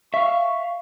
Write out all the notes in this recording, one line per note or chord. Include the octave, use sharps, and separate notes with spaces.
E5 F5 C#6